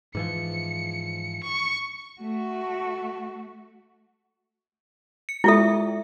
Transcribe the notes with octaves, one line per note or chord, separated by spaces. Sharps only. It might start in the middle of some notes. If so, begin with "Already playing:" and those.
G#2 E3 F3 C#7
C#6
A3 F#4
C#7
G#3 E4 F4 A4 E5